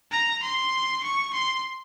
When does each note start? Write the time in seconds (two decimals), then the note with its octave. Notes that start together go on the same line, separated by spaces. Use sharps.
0.11 A#5
0.43 C6
1.03 C#6
1.33 C6